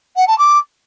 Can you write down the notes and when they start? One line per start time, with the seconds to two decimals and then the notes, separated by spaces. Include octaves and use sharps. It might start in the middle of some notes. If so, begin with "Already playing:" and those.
0.16 F#5
0.27 A5
0.38 D6